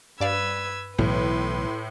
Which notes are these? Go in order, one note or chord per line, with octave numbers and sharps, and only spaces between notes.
G2 B4 D5 F5 E6 G#6
B1 A2 E3 B4 C6